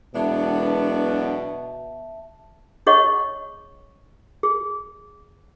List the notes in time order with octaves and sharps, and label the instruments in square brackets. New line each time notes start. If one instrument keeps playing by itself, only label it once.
[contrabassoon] E1 [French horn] B2 [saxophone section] F#3 B3 D4 [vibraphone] E5 A5
[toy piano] D4 G#4 C#5 D#5 F#5 C#6
G#4